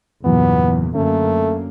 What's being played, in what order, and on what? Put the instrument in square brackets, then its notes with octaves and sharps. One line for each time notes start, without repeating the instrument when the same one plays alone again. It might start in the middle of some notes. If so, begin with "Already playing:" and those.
[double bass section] E2 A#2 C#3 [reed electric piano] G2 E3 F#3 [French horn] B3
[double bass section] F#2 D3 A#3 [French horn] A3 [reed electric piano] C#4